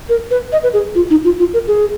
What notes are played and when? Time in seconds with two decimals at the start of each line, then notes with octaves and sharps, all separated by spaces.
0.09 A#4
0.31 B4
0.52 D#5
0.63 B4
0.73 G#4
0.95 F4
1.10 D#4
1.24 F4
1.39 F4
1.53 A#4
1.68 G#4